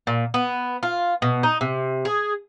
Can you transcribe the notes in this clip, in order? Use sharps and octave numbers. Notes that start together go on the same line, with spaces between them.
A#2
B3
F4
B2
D#4
C3
G#4